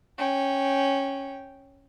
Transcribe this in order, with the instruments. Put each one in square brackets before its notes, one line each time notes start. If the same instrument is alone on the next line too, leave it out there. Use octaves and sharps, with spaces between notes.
[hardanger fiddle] C#4 G5